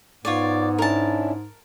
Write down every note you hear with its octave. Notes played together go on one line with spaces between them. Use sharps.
G#2 B3 F4 C#5 D5
C#4 D4 E4 A#4 A5